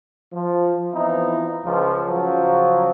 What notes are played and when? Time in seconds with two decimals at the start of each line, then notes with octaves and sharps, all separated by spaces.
0.33 F3
0.93 E3 F3 B3 C4 D#4 E4
1.64 C#2 F3
2.08 C#3 F3 F#3